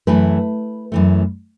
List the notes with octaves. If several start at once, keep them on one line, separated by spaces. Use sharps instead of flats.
F#2 E3 A3 B4
F#2 E3 A3